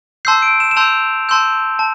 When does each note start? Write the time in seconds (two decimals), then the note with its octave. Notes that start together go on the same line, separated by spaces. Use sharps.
0.25 A5 C6 E6 G6 C7
0.42 D7
0.60 E7
0.71 E7
0.76 A5 C6 E6 G6 F7
1.29 A5 C6 E6 G6
1.79 A5